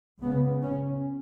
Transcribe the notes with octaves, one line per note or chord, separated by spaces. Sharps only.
C#2 C#3 B3
C#4